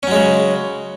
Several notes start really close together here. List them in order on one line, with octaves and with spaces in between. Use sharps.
C#4 F#3 G#3 C#3